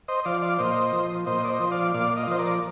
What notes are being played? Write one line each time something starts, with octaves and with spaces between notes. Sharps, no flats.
C5 D#5
F3 D5 F5
D5 F5
A#2 C5 D#5
F3
A#2 C5 D#5
D5
C5 D#5
F3
D5 F5
A#2 D5 F5
D#5
F5
F3 C5 D#5
A#4 D5